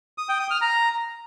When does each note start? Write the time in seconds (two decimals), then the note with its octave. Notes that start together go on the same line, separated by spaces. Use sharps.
0.18 D#6
0.29 G5
0.40 D#6
0.50 F6
0.61 A#5